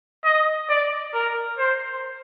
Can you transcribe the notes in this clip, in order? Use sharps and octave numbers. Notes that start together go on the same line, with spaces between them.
D#5
D5
A#4
C5